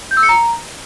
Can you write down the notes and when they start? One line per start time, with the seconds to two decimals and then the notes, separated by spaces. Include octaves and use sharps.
0.11 G6
0.17 E6
0.23 C#7
0.29 A#5